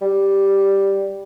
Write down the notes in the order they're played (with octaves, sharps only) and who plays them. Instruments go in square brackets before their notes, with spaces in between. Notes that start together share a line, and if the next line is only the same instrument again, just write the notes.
[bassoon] G3